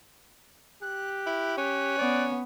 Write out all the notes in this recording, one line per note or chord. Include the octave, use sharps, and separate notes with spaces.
G4 F#6
E4
C#4 F#6
B3 D5